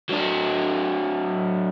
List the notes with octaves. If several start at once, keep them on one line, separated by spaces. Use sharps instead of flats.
F#3 D4